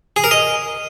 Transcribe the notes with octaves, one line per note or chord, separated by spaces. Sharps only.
G#4
A#4
D#5